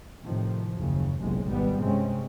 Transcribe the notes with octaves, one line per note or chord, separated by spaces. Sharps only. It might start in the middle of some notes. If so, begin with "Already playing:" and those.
A2 C3 D#3 F3
F#1 D#2 C#3
F#1 B1 C3 G#3
G#1 G3 B3
G2 C3 G#3 C4 C#4